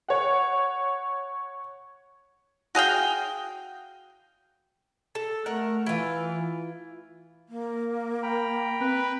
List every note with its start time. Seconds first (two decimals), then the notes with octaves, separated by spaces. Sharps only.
0.08 C#5 F#5
2.75 F#4 G#4 F5 G5
5.15 A4
5.46 A3 A#4 F#5
5.86 E3 E4 F4
7.49 A#3
8.23 G5 A#5 B5
8.81 C4 B4